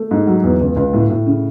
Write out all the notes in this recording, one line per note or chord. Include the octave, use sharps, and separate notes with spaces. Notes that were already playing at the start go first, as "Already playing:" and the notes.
Already playing: A3
G#2
F#3
E2
C#2
C#2
A2
A2
C#3